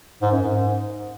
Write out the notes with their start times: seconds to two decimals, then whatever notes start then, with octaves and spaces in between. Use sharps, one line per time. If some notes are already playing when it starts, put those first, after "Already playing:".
0.22 G#2
0.32 F#2
0.42 G#2